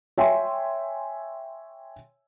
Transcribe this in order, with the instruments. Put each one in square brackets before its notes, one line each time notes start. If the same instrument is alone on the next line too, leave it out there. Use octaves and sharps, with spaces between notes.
[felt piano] C#5 E5 G5 G#5 C6